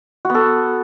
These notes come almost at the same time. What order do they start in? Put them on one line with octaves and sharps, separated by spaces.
F#4 B3 A4